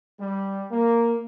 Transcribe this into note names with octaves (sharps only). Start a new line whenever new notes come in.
G3
A#3